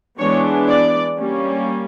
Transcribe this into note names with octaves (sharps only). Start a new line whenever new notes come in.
E3 G#3 B3 D4 C#5
D5
G3 A#3 C#4